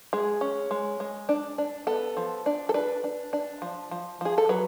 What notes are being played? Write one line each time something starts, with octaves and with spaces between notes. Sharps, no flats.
G#3 G#4
C#4
G#3
G#3
D4
D4
B3 A4
F3
D4
A4
D4 B4
D4
D4
F3
F3
F3 G#4
A4
F#3 B4